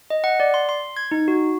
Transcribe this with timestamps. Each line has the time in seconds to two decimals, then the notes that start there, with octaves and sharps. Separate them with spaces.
0.10 D#5
0.24 F#5
0.40 D5
0.54 C6
0.69 C6
0.97 G#6
1.11 D#4
1.28 F#4